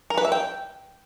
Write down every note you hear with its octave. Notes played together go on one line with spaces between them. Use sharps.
A#4
B4
E5
G5